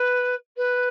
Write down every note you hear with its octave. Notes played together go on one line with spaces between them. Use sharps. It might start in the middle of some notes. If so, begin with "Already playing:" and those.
Already playing: B4
B4